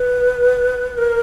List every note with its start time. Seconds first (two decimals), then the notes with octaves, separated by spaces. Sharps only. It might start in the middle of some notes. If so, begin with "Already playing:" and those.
Already playing: B4
0.98 A#4